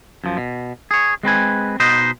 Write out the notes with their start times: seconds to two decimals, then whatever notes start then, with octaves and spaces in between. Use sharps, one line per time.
0.24 F#2 F3
0.37 B2
0.91 G#4 C#5
1.23 G#3 C4 B4 G#5
1.80 B2 D#4 B4 C5 D#5